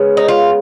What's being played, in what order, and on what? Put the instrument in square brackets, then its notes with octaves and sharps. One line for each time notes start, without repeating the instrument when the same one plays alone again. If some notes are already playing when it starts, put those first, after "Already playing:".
Already playing: [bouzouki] C#3 G#3 B3
D#4
F4